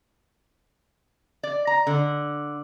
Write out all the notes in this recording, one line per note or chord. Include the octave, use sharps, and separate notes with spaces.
D5
A#5
D3